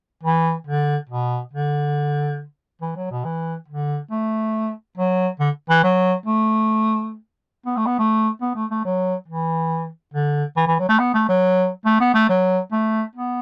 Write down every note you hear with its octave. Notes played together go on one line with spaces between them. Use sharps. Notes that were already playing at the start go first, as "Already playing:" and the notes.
E3
D3
B2
D3
E3
F#3
B2
E3
D3
A3
F#3
D3
E3
F#3
A3
B3
A3
B3
A3
B3
A3
A3
F#3
E3
D3
E3
E3
F#3
A3
B3
A3
F#3
A3
B3
A3
F#3
A3
B3